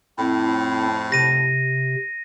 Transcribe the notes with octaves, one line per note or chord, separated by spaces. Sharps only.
F2 A2 C4 E4
C3 A#6 D#7